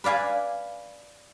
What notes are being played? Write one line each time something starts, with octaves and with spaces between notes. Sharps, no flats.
B4 D5 F5 G#5